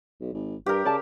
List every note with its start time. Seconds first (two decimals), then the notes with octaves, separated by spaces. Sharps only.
0.20 B1
0.34 G#1
0.66 G2 G4 A#4
0.85 C#3 D5 A5